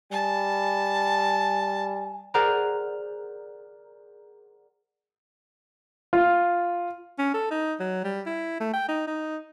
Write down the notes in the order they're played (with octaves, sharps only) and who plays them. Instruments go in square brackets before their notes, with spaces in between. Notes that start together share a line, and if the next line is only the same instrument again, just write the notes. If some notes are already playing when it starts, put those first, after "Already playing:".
[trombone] G3 [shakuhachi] G#5 [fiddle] A5
[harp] G#4 A#4 C5 D5 F#5 A#5
[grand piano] F4
[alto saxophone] C#4
A4
D#4
F#3
G3
E4
A3
G5
D#4
D#4